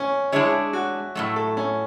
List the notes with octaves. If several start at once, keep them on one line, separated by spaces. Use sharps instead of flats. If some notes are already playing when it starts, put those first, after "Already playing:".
Already playing: C#4
G#3 D4 E4 G#4 C#5
F#4
A2 F#3 A3
A4
C#4